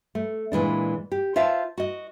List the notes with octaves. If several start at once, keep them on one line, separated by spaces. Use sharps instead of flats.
A3
A#2 E3 G#3 D4
G4
F4 C5 E5 F5 A5
F#4 D#5